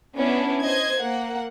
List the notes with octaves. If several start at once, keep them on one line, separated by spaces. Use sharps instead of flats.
B3 C#4 D4 E4
C5 D#5 G#6
A#3 F#5